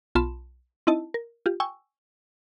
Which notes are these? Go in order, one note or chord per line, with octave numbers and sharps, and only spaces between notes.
B1 F4 A5 B5 C6 E7
C4 D#4 E4 D#5 A5
A#4
F4 G4
G5 G#5 C#6 E6